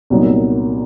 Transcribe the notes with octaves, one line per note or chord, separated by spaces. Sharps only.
C2 A#2 F#3 B3 D#4